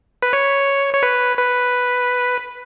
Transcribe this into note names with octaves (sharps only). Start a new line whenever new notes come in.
B4
C#5
C#5
B4
B4